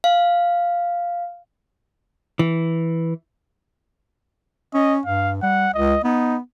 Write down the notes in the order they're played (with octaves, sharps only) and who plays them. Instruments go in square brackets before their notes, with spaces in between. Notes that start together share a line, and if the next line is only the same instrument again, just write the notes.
[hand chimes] F5
[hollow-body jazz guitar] E3
[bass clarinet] C#4 [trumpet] D#5
[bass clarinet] G2 [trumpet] F5
[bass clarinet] G3 [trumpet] F#5
[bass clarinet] C#2 [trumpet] D#5
[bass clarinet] B3 [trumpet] D#4